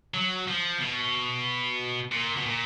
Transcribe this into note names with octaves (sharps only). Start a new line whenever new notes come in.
F#3
F3
B2
A#2
B2
A#2